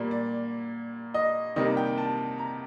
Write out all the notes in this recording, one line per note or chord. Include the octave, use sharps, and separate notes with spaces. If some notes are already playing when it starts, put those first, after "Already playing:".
Already playing: A#2 G3 A#3
D5
D#5
C3 D#3 G3 A#3 D#5
G5
A5
A#5